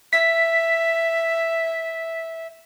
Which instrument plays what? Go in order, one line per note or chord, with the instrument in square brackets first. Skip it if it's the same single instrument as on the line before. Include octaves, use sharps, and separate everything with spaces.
[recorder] E5 [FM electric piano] B6